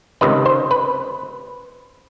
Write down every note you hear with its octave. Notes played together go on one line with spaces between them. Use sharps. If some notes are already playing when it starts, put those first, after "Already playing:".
C#2 C3 D#3 B4
C5
B4